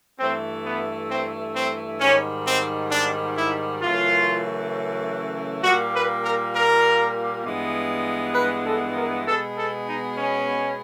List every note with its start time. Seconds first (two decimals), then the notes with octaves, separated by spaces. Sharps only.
0.19 G2 E3 A3 C4
0.64 B3
1.10 C4
1.55 C4
2.00 G#2 D#3 G3 C#4
2.46 C4
2.91 D4
3.37 E4
3.82 F#2 C#3 E3 A3 F4
5.63 A#2 G3 A#3 F#4
5.93 B4
6.23 A#4
6.54 A#4
7.44 G2 E3 G#3 B3
8.35 B4
8.66 A4
8.96 A#4
9.26 B2 G#3 B3 A4
9.57 A4
9.87 D#4
10.17 C#4